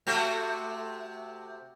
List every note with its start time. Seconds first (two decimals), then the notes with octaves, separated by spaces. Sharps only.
0.07 C3 A3 F#4